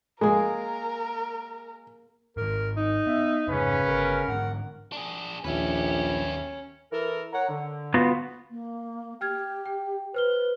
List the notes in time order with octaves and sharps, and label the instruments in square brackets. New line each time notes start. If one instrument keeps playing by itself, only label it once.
[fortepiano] G#3 [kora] A#3 G#4 [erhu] A#4
[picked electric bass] G#2 D#3 [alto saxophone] A#4
[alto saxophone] D#4
[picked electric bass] B3 [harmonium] E5
[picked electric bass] F1 G#2 [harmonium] C#3 [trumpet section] C#4 B4
[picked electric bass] G1 [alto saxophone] A#4
[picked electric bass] G#2 D3 [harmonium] F#5
[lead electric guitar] D4 G#4
[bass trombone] A#1 [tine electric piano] D#2 D#3 E5 [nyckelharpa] C#4 [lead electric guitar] G4 B4
[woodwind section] E3 A4 A#4
A#4 C#5 F#5
D3
[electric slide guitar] B3 F4 F#4
[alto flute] A#3
[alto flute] G4 [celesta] G5 F6 G#6
[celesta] G5
[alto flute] B4 [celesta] C5 F6 G7